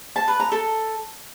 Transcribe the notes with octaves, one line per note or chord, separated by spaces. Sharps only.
A5
B4
A#5
A4